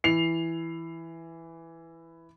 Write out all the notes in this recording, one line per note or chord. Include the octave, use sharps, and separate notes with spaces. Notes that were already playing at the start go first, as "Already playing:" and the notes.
E3 C7 F7